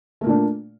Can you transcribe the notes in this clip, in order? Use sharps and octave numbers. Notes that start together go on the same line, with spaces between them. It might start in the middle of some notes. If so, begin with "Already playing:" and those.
A#2 A3 A#3 D4